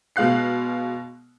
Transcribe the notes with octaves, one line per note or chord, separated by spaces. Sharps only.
B2 G#3 F5 F#6 C7